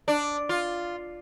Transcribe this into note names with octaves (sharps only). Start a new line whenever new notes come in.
D4
F4